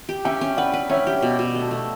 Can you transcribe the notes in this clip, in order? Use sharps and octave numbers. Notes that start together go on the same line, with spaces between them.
G4
C#4 E5 G5
C#4
B4 D5 F#5
B4
C#4 C#5 E5
G4
B2
B2
A3
A3